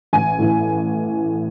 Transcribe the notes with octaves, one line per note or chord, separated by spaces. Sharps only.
A1 G#5
A2 E3